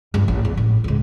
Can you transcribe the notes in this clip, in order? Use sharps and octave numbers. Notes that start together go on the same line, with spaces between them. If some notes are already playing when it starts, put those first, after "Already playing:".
G2 F3
A1
E2
A1
C#2 G#2